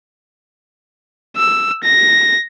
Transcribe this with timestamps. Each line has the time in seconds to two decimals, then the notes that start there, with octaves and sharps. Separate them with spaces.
1.37 E6
1.83 A#6